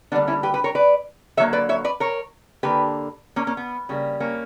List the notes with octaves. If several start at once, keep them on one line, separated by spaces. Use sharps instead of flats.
D3 G3 A#3 B3 D4
C#4 E4
G4 B4
G4 B4
A#4 C#5
B4 D5
D3 F#3 A#3 C#5 E5
B4 D5
C#5 E5
B4 D5
A#4 C#5
D3 A#3 G4 B4
A#3 C#4
A#3 C#4
B3
C#3 G3 A#3
A#3 C#4